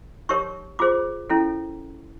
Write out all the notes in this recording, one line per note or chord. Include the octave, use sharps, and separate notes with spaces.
D#4 G4 A#4 C#5 C#6
F4 G#4 C5 D6
C#4 E4 A4